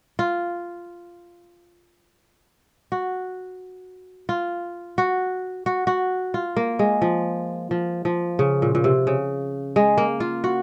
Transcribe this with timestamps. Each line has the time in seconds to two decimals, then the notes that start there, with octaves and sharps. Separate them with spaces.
0.19 F4
2.92 F#4
4.29 F4
4.98 F#4
5.66 F#4
5.87 F#4
6.34 F4
6.56 A#3
6.79 G#3
7.02 F3
7.71 F3
8.05 F3
8.39 C#3
8.62 A#2
8.75 A#2
8.84 C3
9.07 C#3
9.76 G#3
9.98 A#3
10.20 F4
10.44 F#4